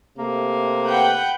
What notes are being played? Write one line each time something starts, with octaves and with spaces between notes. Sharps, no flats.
C3 A3 A#3
B4 F#5 G5